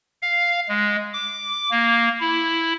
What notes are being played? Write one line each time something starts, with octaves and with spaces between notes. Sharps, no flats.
F5
G#3
D6
A#3
E4